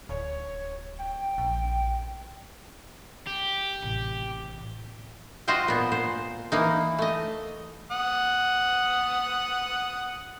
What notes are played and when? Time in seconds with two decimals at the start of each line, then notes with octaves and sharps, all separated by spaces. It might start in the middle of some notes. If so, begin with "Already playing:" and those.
0.09 D1 C#5
0.98 G5
1.38 A#1
3.27 G4
3.82 A1 C3
5.48 F4 F#4 C5 D#5 G5
5.68 A#2 B3
5.92 A#2 C5
6.52 E3 A#3 D#4
6.98 A3 D#5
7.91 F#5 D#6